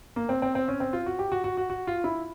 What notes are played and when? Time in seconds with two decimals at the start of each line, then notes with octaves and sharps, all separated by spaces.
0.16 A#3
0.29 C4
0.42 C4
0.55 C4
0.68 C#4
0.80 C4
0.93 F4
1.06 F#4
1.19 G4
1.32 F#4
1.44 F#4
1.57 F#4
1.70 F#4
1.87 F4
2.04 E4